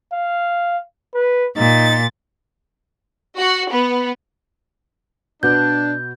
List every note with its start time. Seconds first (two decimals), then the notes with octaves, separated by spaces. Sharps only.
0.12 F5
1.14 B4
1.57 A#2 D#4 A6
3.38 F#4
3.71 B3
5.43 B2 B3 D4 F#4 G6